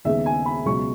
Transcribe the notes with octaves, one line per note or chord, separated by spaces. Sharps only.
D#2 C#3 G#3 B3 E5
G#5
B5
C#2 B2 F#3 C#6